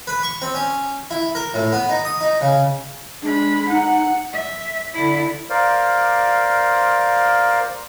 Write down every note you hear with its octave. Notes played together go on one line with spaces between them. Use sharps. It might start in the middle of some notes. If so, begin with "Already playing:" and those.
B4
C#6
C4
C#4
E4
A#4
A2
B3
D#4
D#6
D#4
C#3
G#3 D4 B5
D#4 F#5
E5
D3 E4
A#4 C5 D5 F5